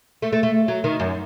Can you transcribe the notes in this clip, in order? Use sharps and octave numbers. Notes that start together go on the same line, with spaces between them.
A3
A3
A3
F#3
D#3
F#2